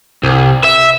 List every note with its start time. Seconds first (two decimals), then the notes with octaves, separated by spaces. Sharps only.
0.23 C2
0.64 E5